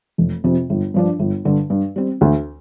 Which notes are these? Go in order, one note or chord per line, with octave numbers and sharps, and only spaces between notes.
F1
F2 C3
G1
G2 F3 D4
G1
G2 D3
G2
G3 C4
D2